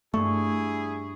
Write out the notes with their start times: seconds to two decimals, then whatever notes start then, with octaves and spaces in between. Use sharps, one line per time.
0.14 G2 A3 E4 G#4 C#6